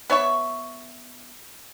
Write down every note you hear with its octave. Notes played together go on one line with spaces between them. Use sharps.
B3 C#5 E5 C#6